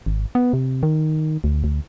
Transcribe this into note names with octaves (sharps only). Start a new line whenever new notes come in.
G#1
B3
C3
D#3
D2
D2